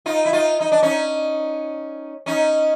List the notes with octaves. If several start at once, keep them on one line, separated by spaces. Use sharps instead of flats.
D#4 F4
E4
D#4 F4
D#4
D4
C#4 D#4
C#4 D#4